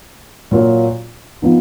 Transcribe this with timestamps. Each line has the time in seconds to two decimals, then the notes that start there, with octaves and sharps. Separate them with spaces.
0.51 A#2 F#3 A#3 F4
1.42 F3 B3 D#4